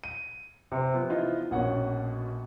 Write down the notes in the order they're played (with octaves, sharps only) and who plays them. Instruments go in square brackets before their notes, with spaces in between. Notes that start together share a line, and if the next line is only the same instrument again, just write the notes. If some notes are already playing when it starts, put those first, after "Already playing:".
[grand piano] D#7
C3 C4
F3 B3
[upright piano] E3 D#4 F4
[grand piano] A#1 F#5 [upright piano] B2 A#3 C#4